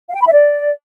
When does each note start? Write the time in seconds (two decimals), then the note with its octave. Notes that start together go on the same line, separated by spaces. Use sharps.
0.09 F5
0.15 G5
0.21 B5
0.26 E5
0.32 D5